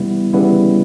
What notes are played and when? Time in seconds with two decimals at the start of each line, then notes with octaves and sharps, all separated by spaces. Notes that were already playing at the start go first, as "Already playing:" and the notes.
Already playing: C#3 E3 G3 B3 E4
0.33 C#3 E3 G3 B3 E4